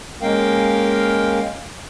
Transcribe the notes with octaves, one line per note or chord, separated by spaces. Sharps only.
G#3 A#3 C#4 A#4 F5 G5